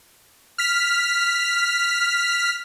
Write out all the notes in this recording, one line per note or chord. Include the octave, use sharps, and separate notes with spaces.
F6 B6